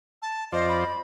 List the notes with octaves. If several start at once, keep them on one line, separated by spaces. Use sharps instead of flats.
A5
F2 F4 C5 D5 D#5
B5